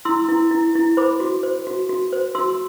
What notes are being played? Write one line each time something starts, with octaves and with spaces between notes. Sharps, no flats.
E4 C6 E6
E4
E4
E4
C5 B5 D6
F#4
C5
F#4
F#4
C5
F#4 C6 E6